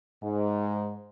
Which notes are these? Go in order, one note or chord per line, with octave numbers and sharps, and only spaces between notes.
G#2